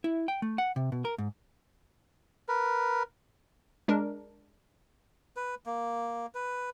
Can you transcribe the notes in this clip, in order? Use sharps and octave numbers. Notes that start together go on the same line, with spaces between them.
E4
G5
A3
F#5
C3
B2
A#4
G#2
A#4 B4
G#3 D4 A#4
B4
A#3
B4